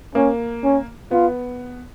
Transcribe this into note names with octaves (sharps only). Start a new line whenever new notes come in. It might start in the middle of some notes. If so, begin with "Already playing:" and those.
A#3 C#4
C#4
B3 F4